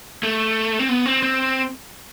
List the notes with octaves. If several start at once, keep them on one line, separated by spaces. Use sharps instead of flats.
A3
C4
B3
C4
C4